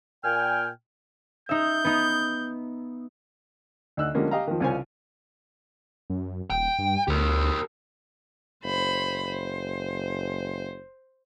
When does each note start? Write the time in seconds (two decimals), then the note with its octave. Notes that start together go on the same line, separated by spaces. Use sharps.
0.24 A#2 G5 G#5 F6
1.49 D#4 E5 G6
1.85 B3 D#4
3.97 D2 D#4 E6 F#6
4.15 D3 F3 G3 G#3 A#3 C#4
4.31 G4 D#5 F5 A#5
4.47 D#3 F3
4.60 C2 C#3 C#4 F4 C5 G#5
6.10 F#2
6.50 D#1 G5
6.79 G2
7.08 D2 G4 A#4
8.64 F#1 C5 B5
9.29 C5